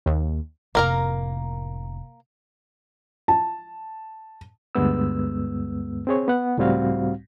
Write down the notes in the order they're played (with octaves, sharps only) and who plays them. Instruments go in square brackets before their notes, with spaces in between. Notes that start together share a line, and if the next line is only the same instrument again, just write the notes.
[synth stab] D#2
[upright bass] F1 A2 [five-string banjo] A#3 A#4 A#5
[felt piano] A5
[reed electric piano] D2 G2 G#3 B3 E6
C4 G#4 C#5
B3 F#5
C#2 A2 G3 C4 F#4 F5